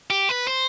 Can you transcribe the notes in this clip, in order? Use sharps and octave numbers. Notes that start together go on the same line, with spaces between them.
G4
B4
C5